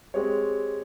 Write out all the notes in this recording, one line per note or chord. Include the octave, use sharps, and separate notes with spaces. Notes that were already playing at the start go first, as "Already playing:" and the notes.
G#3 C4 G4 C#5